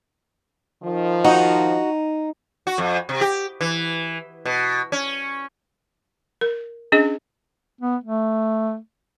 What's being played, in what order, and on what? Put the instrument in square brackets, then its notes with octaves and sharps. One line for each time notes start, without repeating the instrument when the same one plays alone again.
[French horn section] D#3 F3
[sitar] D#4 [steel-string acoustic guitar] F#4
[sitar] F#4
F2
C3
G4
E3
B2
C#4
[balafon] A#4
C#4 D4 G#4 D#5
[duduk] B3
A3